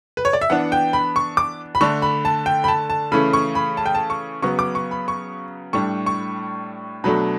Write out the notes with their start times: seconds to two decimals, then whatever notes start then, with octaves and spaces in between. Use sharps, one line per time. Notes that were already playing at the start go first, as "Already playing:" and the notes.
0.17 B4
0.25 C#5
0.33 D5
0.41 E5
0.50 E3 B3 D4 F#5
0.72 G5
0.93 B5
1.16 C#6
1.37 D6
1.75 B5
1.81 D3 A3 D4 C#6
2.02 B5
2.25 A5
2.46 G5
2.64 B5
2.68 A5
2.90 A5
3.12 C#3 E3 A3 C#4 B5
3.33 C#6
3.55 B5
3.77 A5
3.86 G5
3.95 A5
4.10 C#6
4.42 C#3 F#3 B3 C#6
4.59 D6
4.75 C#6
4.91 B5
5.08 C#6
5.73 A2 G3 D4 C#6
6.06 C#6
7.04 B2 F#3 A3 D4 B5